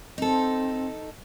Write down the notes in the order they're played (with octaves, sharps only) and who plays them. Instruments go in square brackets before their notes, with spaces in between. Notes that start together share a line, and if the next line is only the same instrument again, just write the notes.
[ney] C4 [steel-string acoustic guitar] D#4 A4